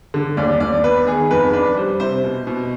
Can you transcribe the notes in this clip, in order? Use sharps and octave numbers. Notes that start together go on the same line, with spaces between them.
D3
D#2 D5
D#2 D5
B3 B4
D#3 G#4
F2 B4
D4 B4
G3 C5
C3 C5
B2
B2